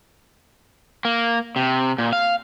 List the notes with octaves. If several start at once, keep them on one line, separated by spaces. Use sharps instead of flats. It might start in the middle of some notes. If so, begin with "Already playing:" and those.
A#3
C3
A#2
F5